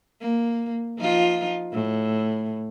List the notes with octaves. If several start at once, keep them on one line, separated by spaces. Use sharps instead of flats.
A#3
F3 D#4 F4
A2